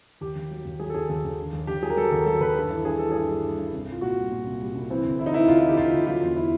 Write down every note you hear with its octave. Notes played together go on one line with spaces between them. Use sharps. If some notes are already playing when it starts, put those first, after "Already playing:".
D#2 G4
D#2
F#3
D#2
F#3 G#4
A4
D#2 G#4
D#2 A4
D#2
D3
D#2
D#2 G4
F#3 G#4
A#4
F#3 A4
D#2 A#4
F#3 A4
D#2 B4
G2 A4
E3
G2 G#4
E3 A4
G2 G#4
G3
G3
G2
C2
G3 F4
A#2 F#4
G3
A#2
C2
G3
C2
E3 C4
D2
E3 E4
D#4
E3 E4
D2 F4
F4
E3 G4
D2 F4
D2
F#3 F4
E2
E4